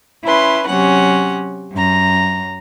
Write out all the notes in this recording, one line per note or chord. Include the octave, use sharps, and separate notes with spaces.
C#4 E4 B4 C6
C3 F#3 C#4 F#5
F#2 A#5